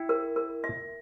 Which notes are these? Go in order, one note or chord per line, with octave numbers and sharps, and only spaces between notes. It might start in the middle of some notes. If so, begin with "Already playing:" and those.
Already playing: E4 G5
A#4
A#4
E5